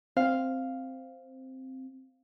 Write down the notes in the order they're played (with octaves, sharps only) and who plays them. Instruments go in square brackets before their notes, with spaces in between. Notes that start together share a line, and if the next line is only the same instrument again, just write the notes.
[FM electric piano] C4 [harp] F5